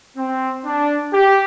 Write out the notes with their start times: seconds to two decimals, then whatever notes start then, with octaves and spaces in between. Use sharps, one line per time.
0.17 C4
0.65 D4
1.13 G4